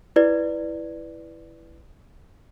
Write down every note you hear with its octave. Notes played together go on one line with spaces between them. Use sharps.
E4 B4 D5